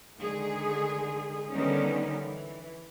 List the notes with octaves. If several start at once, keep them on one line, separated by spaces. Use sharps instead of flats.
D3 D#3 G#3 G#4
D3 D#3 G3 B3 C#4 D#4
E3